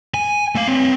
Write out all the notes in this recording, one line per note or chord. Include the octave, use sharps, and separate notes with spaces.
G#5
A3 F5
C4 C#5